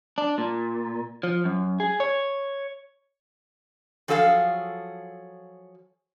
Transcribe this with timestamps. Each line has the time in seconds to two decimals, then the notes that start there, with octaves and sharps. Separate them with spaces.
0.18 D4
0.38 A#2
1.23 F3
1.45 F#2
1.80 G#4
2.00 C#5
4.08 F3 F#3 G#4 A4 D#5 F5